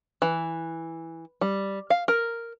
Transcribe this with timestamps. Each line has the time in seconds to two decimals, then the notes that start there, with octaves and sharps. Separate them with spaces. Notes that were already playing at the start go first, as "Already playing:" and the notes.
0.22 E3
1.41 G3
1.90 F5
2.08 A#4